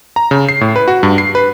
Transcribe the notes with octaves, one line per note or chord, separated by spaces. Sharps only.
A#5
C#3
C7
A2
B4
F#4
G2
C7
B4